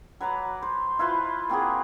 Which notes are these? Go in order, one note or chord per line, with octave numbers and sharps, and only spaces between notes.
F#3 B4 A#5 D6
C5
E4 F4 B4 C5
A#3 C4 F#4 G#4